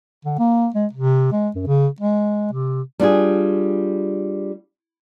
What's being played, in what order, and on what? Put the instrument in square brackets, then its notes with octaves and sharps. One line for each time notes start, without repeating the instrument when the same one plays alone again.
[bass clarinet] D3
A#3
G#3
C3
G#3
F#2
C#3
G#3
C3
[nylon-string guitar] G3 D4 F4 G#4